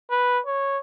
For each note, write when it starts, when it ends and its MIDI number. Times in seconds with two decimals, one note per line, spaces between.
0.11 0.39 71
0.46 0.78 73